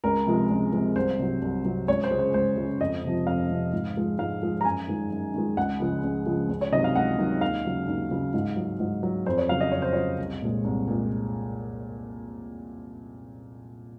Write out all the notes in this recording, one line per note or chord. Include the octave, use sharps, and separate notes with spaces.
C#2 A#4
C3 F3 G#3
C#2
C3 F3 G#3
C2 C5
C3 F#3
C2
C3 F#3
C#2 C#5
C5
C#3 G#3
C5
C#2 C5
C#3 G#3
F2 D#5
C3 F3
F2 F5
C3 F3
G#2
F3 G#3
G#2 F5
F3 G#3
A#5
F#2 G#5
D#3 G#3
F#2
D#3 G#3
C#2 F#5
C#3 F3 G#3
C#2
C#3 F3 G#3
C#2
C#5
C3 D#3 F#3 D#5
F5
C#2 F#5
C3 D#3 F#3
D#2 F5
C#3 F#3
D#2
C#3 F#3
G#2
F#3
G#2
F#3
F2 C5
C#5
C#3 F#3 F5
D#5
F2 C#5
C5
C#3 F#3 C#5
C2
A#2 G#3
C2
A#2 G#3